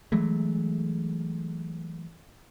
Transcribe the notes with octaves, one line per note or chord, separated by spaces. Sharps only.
E3 F#3 G#3 A3